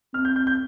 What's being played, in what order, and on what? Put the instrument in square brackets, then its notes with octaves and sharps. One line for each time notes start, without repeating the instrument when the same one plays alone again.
[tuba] C4 [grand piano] F6
[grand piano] G6
G6
G6